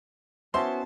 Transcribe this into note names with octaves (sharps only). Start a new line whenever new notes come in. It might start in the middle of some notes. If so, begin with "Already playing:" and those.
B3 C#4 E4 F#4 C5 E5 A5 C6